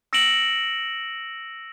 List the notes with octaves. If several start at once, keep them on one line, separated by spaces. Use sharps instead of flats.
E6 A#6 C#7 D7 E7 F#7